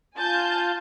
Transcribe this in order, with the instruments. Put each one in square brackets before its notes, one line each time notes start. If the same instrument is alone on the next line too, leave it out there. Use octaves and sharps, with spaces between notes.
[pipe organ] F4 [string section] G#5 A5 G6